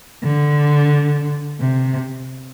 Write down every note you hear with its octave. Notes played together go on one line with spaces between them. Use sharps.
D3
C3